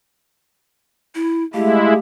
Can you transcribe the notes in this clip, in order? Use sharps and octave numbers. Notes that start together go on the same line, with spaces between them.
E4
G#3 A3 E4 G4 F5